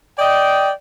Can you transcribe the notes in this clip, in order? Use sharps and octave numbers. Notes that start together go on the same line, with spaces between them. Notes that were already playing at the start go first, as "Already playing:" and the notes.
D5 D#5 G5